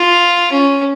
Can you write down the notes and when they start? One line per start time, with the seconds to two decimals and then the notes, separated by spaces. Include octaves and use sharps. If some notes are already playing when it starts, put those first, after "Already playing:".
Already playing: F4
0.51 C#4